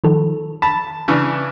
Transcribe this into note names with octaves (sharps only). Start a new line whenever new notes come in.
D#3 F3 A4
A5 B5
C#3 E3 D4